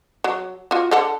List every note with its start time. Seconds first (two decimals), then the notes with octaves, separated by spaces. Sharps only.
0.24 F#3
0.71 F4 F#4
0.91 D3 A4 F#5